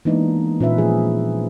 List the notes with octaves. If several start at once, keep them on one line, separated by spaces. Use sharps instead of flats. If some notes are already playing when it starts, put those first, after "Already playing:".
E3 G#3 A#3 B3 D4 D#4
A#2 C#4 B4 E5
F3 G#4